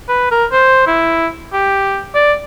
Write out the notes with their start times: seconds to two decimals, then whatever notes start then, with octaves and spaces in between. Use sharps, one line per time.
0.09 B4
0.31 A#4
0.52 C5
0.87 E4
1.53 G4
2.15 D5